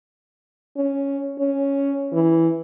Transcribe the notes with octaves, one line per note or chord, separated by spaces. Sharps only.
C#4
C#4
E3